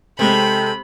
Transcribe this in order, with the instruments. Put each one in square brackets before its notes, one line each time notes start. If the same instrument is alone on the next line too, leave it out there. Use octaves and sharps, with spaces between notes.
[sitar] C3 [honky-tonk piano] G#3 C4 [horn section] A4 G5 [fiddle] B5